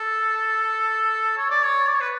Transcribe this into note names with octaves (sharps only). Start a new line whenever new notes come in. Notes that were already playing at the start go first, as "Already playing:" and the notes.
Already playing: A4
C#5
D5
C#5
D5
C#5
B4